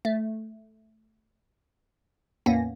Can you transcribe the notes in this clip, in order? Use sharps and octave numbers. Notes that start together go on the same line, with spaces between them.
A3
E2 A2 A#3 B3 C#4 A#6